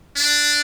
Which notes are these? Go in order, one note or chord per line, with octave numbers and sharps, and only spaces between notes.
D4